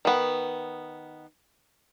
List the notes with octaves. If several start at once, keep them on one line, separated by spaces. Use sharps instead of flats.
D#3 B3